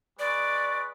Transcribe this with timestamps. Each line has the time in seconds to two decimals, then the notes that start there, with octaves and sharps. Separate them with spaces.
0.19 G#3 B4 D5 C#6